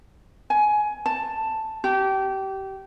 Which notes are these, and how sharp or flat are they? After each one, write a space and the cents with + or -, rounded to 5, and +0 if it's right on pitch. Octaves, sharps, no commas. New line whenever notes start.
G#5 +15
A5 +5
G4 -25